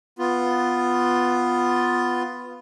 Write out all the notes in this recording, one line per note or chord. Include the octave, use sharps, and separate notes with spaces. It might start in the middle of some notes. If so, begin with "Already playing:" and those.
B3 F4